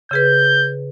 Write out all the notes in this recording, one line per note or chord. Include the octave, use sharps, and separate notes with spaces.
C#3 G#4 B4 G6